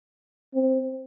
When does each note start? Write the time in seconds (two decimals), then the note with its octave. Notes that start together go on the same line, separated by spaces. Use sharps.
0.54 C4